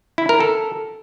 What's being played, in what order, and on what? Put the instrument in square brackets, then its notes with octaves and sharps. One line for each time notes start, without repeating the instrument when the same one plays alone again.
[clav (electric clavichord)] E4
A#4
A4